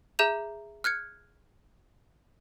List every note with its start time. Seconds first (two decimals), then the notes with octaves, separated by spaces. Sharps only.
0.19 G#4 E5 A#5 G6 E7 F7
0.84 F6 F#6 G#6 C#7